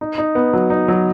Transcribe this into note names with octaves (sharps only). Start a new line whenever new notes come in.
D#4
D#4
B3
F#3
D#4
F#3